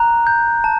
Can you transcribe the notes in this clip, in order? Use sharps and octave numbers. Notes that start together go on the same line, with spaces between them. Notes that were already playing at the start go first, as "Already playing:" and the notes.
Already playing: A#5 F#6
G6
A5